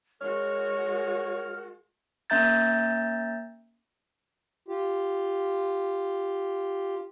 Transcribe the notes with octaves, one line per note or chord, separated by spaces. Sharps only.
G#3 F#4 A#4 C#5 F6
A#3 C#4 E5 A#5 G6 A6
F4 G4